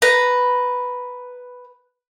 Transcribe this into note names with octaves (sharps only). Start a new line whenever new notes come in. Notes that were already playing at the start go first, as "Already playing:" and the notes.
B4 A#5